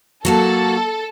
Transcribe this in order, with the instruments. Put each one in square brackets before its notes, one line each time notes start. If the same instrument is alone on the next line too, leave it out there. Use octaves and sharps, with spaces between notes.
[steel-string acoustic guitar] F#3 A#3 F#4 [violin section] A4